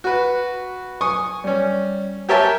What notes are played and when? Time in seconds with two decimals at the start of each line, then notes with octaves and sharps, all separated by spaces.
0.04 F#4 B4
1.01 G#5 C#6 D#6
1.44 G3 C#4
2.29 G4 A#4 C#5 E5 G#5 A5